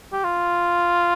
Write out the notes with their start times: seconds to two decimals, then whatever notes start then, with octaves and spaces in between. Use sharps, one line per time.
0.12 G4
0.24 F4